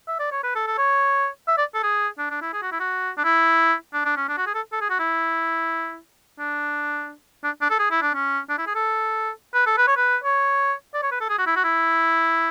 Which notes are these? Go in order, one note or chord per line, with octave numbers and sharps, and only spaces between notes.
E5
D5
C#5
B4
A4
A4
C#5
E5
D5
A4
G#4
D4
D4
E4
G#4
F#4
E4
F#4
D4
E4
D4
D4
C#4
D4
F#4
G#4
A4
A4
G#4
F#4
E4
D4
D4
D4
A4
G#4
E4
D4
C#4
D4
E4
G#4
A4
B4
A4
B4
C#5
B4
C#5
D5
C#5
B4
A4
G#4
F#4
E4
F#4
E4